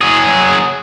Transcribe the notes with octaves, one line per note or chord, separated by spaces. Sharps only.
F#3 G#4